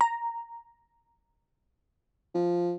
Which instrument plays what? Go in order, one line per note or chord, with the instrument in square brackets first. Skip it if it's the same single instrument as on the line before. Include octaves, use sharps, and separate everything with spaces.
[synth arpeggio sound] A#5
[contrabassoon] F3